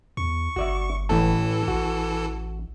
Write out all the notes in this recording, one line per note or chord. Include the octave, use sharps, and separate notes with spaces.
E2 C#6
G1 F#4 D5 E5
A1 A2 E3 A4 A5
A1 F#4